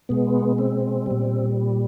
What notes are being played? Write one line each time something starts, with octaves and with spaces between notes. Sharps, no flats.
B2 G#3 B3
C4
A#2 G3